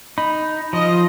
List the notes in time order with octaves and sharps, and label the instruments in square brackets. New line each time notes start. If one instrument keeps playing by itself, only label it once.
[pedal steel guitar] D#4 [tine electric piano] B5
[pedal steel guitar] F3 [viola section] F4 D#5